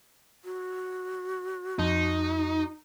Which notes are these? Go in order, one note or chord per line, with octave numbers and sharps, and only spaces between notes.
F#4
F2 D#4